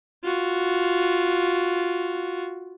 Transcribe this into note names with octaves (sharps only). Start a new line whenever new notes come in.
F4 F#4